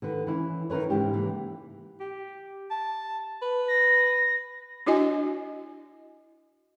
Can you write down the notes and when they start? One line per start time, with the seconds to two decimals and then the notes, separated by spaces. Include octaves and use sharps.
0.02 D3 D#3 B4
0.27 E3 C#4 E4
0.70 D#3 E4 A#4 B4 C#5
0.90 G#2 C#3 E3 E4 G4
1.13 E3 A#3
2.00 G4
2.71 A5
3.42 B4
3.68 A#6
4.87 D4 E4 F#4 D#5 G#5